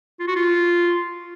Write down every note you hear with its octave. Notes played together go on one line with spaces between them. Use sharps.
F4
F#4
F4